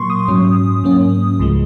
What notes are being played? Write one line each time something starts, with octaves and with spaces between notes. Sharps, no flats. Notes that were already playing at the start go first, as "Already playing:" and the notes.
Already playing: A#2 F#3 A#3 C6 C#6
D#6
G#2 F#3 C#4
G#2 F#3 A#3 C#4
C#2 C#3 F3 G#3